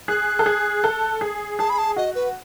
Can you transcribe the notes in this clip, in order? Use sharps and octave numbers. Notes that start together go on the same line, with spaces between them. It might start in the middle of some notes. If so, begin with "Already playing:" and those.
G#4 F#6
A4
G#4
A4
G#4
G#4 A5
B5
A5
F#4 D#5
B4